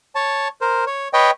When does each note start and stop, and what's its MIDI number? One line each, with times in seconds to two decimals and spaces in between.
0.15 0.48 73
0.15 0.48 81
0.61 0.85 70
0.61 0.85 72
0.87 1.08 73
1.13 1.31 71
1.13 1.31 73
1.13 1.31 75
1.13 1.31 79